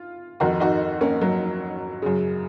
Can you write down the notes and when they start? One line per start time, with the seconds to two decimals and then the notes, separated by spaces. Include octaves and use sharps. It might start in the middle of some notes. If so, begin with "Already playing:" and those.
Already playing: F4
0.40 F2 D#3 F#4 A#4
0.60 D#4 F#4
1.01 A#3 C#4
1.21 F#3 A#3
2.02 F#2 C#3